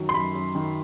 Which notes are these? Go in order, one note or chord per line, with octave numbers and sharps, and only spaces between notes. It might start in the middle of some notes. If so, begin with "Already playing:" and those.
Already playing: F#2 D#3 F#3
C6
F#2 B5
F#2
D#3